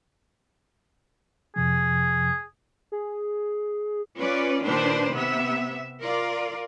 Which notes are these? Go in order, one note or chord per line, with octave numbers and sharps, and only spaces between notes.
F2 C3 F3 G#4
G#4
C#4 F4 B4 D5
A#2 D#3 D4 B4 C5
C3 B3 E5
F4 A#4 D5